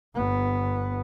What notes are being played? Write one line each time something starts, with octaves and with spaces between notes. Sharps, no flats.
G1 B3